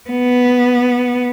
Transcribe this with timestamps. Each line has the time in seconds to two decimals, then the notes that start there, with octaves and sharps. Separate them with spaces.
0.10 B3